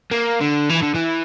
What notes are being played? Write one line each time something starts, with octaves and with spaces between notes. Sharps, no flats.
A#3
D3
E3
D3
E3